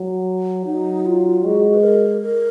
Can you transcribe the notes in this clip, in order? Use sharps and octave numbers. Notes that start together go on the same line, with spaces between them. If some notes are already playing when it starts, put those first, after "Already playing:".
Already playing: F#3
F#3 D#4
F4
G#3 F#4
B4
A#4
A#4